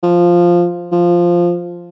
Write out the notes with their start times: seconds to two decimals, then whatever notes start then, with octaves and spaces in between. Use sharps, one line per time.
0.03 F3
0.92 F3